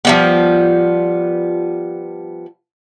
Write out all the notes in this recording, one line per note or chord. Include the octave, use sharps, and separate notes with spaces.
F3 G3 B3